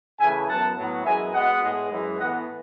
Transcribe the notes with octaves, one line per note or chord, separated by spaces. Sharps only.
C#3 E3 A3 E5 G#5
F#2 E3 B3 F#5 A5
A2 F#3 B3
F#2 E3 G#3 B3 E5 G#5
B2 G#3 B3 D#5 F#5
A2 G#3 B3
F#2 E3 G#3
A2 E3 B3 D#5 F#5